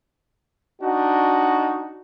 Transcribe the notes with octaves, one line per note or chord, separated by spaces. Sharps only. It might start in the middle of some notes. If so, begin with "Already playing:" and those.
D4 D#4 F#4